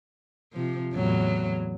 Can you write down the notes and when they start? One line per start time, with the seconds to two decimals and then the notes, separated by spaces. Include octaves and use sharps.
0.53 C3 F3
0.93 E2 A2 F#3